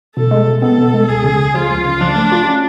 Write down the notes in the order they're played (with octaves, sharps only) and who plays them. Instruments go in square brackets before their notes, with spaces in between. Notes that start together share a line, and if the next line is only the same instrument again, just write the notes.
[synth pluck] B2 [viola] A4
[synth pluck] G#3
B2
[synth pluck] B3 [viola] A4
[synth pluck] B2
G#3
[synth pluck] C#2 [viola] G#4
[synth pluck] C#3
C#2
[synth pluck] F3 [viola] F4
[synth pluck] C#2
C#3
[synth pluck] F3 [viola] D4
[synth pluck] A3
F4
C#4